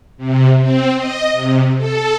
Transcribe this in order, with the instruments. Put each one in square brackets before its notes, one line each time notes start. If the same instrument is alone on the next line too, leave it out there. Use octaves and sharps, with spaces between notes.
[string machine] C3
C4
D#5
C3
A4